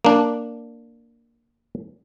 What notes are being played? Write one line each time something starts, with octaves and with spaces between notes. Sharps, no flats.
A#3 D4